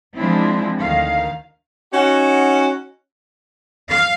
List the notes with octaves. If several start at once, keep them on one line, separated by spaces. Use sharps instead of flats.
F3 G#3 C4 D4 E4
D2 D#3 F5
C#4 D#4 F#4
F5